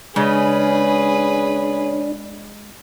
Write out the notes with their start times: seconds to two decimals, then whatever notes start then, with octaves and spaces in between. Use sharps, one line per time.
0.16 C#3 G#3 D4 G#4 B4